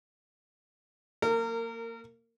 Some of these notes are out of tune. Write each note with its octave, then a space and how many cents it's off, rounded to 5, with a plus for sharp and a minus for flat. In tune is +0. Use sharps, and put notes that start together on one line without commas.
A#3 -15 A#4 -30